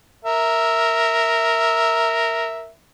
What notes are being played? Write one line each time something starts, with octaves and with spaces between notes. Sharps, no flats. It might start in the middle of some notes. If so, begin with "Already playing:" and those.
A#4 E5